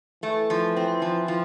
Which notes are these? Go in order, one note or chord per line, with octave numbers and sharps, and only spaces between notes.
E3 A3
F3
C4
F3
F3